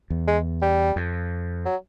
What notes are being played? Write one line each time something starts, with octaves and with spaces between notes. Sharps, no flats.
E2
G#3
G3
F2
F#3